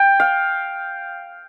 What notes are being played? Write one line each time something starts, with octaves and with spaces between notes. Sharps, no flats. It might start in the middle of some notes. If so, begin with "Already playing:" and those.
Already playing: G5
F5